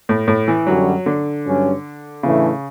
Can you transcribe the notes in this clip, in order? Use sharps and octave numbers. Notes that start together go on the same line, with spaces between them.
A2
A2
E3
F#2 D3 F#3 G3 C#4 F#4
D3
G2 F#3 C#4
A2 C#3 E3 A3 D4